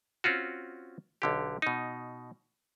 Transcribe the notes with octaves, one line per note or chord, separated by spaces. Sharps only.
C4 C#4 F4 F#4
B1 D3 G4
B2 D#4